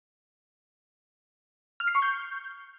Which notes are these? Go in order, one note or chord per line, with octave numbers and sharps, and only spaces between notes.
F6
C7
C#6
G6